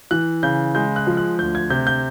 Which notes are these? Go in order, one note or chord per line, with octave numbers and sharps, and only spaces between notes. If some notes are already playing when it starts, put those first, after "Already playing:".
E3 F#6
C#3 G6
G#3 G6
F#6
F3
F#6
D2 G6
G#6
C3 G6
G6